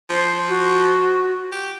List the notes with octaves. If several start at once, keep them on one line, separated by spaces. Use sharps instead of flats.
F3 C5
F#4
G4